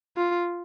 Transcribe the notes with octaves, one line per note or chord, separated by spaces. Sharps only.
F4